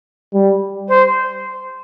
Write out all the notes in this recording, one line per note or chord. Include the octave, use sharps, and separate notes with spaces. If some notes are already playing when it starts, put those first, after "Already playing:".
G3
C5